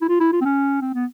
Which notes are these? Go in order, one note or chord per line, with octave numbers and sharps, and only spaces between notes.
E4
F4
E4
F4
C4
C#4
C4
B3